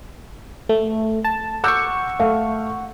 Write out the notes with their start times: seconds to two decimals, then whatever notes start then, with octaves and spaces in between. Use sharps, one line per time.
0.69 A3
1.25 A5
1.64 F#5 C#6 D6 E6 G6
2.20 A3 F5